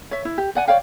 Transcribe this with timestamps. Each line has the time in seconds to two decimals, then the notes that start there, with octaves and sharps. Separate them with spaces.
0.11 C#5 E5
0.25 E4
0.38 G4
0.55 D5 F#5 G#5
0.68 C#5 D5 F5 G5